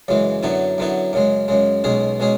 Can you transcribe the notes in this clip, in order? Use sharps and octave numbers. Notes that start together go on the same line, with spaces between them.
F#2 C#3 E3 G#3
F#2 D3 F#3 B3 E4
F#2 D3 F#3 B3 E4
F#2 C#3 G#3
F#2 C#3 G#3
B1 B2 G#3 C#4 G#4
B2 G#3 C#4 G#4